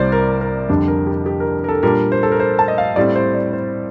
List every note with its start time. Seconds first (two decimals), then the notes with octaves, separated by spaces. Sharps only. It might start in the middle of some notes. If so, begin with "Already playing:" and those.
Already playing: C2 C3 G3 C5 D5
0.12 A#4
0.41 A#4
0.69 F2 D3 G3 D4
0.88 A#4
1.07 G4
1.26 G4
1.40 A#4
1.64 A#4
1.68 A4
1.83 A#2 G3 A#3 D4 A#4
2.12 C5
2.23 A4
2.32 A#4
2.40 C5
2.59 A5
2.68 D#5
2.78 F5
2.96 A2 G3 C4 D5
3.16 C5
3.35 D5
3.53 C5